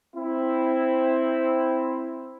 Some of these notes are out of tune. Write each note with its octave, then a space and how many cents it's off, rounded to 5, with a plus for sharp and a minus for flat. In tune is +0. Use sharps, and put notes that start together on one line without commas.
C4 +0 E4 +0